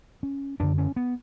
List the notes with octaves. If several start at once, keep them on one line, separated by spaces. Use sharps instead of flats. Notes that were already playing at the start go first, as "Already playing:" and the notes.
C#4
F#2 D3 D4
C#4
B3